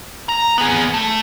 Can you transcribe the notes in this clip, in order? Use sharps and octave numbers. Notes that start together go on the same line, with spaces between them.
A#5
B3 G#4
A3